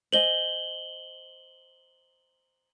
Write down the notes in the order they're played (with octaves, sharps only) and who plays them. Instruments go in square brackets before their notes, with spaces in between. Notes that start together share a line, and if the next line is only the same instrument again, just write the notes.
[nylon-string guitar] C5 D#5 G#5 [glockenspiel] F#7 G7